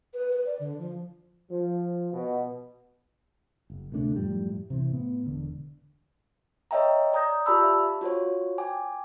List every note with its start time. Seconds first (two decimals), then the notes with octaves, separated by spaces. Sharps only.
0.14 B4
0.33 B4
0.46 D5
0.59 D3
0.79 F3
1.51 F3
2.13 B2
3.70 F#1
3.92 D2 C3 A3 D4
4.16 F#2 A2 F3 G3
4.70 C3 E3 C4
4.91 A2 B3
5.26 E1 D3
6.71 C#5 D#5 E5 G5 A#5
7.13 D5 A#5 D#6 G6 A#6
7.46 F4 G4 D5 A5 B5 E6
7.63 E5 A5
8.01 F4 F#4 C5 C#5
8.58 G5 G#5 D6